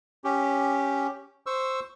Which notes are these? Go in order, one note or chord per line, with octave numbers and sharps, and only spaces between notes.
C#4 G4
C5 C#6 E6